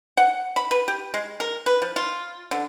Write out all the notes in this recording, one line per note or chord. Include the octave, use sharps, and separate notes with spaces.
F#5
B5
B4
G4
G#3
A#4
B4
F3
F4
D3